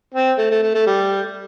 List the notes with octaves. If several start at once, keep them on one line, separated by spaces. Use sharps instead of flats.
C4
A3
A3
A3
A3
G3